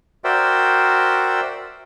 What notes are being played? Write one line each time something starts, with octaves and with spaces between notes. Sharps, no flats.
F#4 A#4 C5 D5 E5 G5